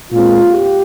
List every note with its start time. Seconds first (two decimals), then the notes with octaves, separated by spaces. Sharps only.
0.12 A#2 G#3 C4 F4
0.52 G4